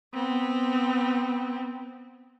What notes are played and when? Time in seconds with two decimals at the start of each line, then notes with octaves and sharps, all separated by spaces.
0.14 B3 C4